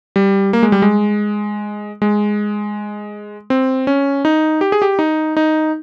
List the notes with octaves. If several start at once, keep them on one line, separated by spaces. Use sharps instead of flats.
G3
A#3
G#3
G3
G#3
G#3
C4
C#4
D#4
G4
G#4
G4
D#4
D#4